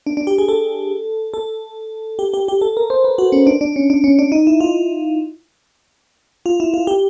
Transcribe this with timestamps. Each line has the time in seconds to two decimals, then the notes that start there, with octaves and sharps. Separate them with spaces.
0.07 D4
0.17 D4
0.27 G4
0.38 G#4
0.48 A4
1.34 A4
2.19 G4
2.34 G4
2.48 G4
2.61 A4
2.77 A#4
2.90 C5
3.04 B4
3.18 F#4
3.32 C#4
3.47 D4
3.61 D4
3.76 C#4
3.90 D4
4.04 C#4
4.19 D4
4.32 D#4
4.47 E4
4.61 F4
6.46 F4
6.60 E4
6.74 F4
6.87 G4